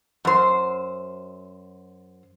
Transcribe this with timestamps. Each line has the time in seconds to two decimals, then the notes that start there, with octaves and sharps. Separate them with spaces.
0.25 F#2 C5